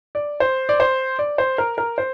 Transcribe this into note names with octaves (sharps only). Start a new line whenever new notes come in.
D5
C5
D5
C5
D5
C5
A#4
A#4
C5